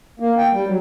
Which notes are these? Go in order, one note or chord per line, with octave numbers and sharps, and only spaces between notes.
A#3
G5
G3
F#3